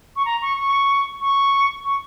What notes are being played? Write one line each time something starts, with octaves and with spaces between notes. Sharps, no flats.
C#6
A#5
C#6
C#6
C#6
C#6